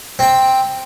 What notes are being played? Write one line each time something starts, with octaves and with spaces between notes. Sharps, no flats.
C4 G5